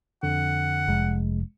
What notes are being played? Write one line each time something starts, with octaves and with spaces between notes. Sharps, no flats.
F2 D3 F#5
F1 G#3